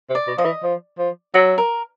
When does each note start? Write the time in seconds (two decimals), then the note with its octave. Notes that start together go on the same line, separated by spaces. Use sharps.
0.09 C3
0.15 D5
0.27 B2
0.38 F3 D#5
0.45 E3
0.63 F3
0.98 F3
1.34 F#3 E5
1.58 A#4